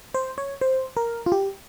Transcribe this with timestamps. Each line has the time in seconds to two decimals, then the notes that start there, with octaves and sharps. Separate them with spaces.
0.14 C5
0.38 C#5
0.61 C5
0.97 A#4
1.26 F4
1.32 G4